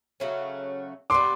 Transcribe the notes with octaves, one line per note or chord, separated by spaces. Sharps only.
C#3 F#3 A3 C#4
G3 B3 D4 C6 D6